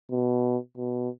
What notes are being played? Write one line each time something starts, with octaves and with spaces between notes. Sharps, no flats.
B2
B2